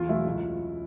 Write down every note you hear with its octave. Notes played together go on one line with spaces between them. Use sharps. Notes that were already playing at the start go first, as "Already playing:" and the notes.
Already playing: E2 F4
B2 F#3 A3 E4
C#2